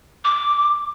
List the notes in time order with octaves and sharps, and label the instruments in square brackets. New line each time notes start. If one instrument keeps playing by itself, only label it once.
[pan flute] D6